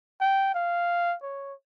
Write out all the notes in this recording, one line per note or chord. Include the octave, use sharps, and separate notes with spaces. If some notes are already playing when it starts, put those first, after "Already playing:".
G5
F5
C#5